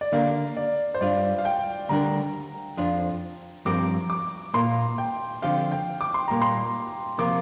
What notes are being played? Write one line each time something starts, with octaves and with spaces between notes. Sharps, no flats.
D5
D3 A#3 D4 G4 A#4 F5
D5
C5
G2 G3 D4 F4 D5
F5
G5
D2 D3 G3 D4 A#4 A#5
F2 F3 D4 F4
G2 F3 C4 G4 A#4 D6
D6
A#2 A#3 F4 A#4 C6
G5
D3 F3 C4 G4 F5
G5
D6
C6
A#2 G3 A#3 A#5
C6
C3 F3 A#3 F4 A#4 D6